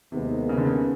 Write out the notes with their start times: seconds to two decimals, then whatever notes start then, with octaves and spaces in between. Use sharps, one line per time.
0.12 D#2 C3 D#3 G#3 B3
0.49 C#3
0.57 D3
0.65 C#3